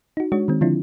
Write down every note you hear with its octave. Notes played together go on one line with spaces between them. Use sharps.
D#4 F#4
G#3 D4 F#4 C#5
D#3 G#3 C4
D3 F3 C4 D4 E4 F4